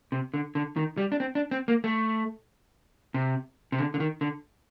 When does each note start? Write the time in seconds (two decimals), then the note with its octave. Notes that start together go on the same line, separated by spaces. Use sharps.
0.12 C3
0.34 D3
0.55 D3
0.76 D#3
0.97 G3
1.12 D4
1.20 C4
1.35 D4
1.51 C4
1.68 A#3
1.84 A3
3.14 C3
3.72 C3
3.79 D3
3.94 D3
4.00 D#3
4.21 D3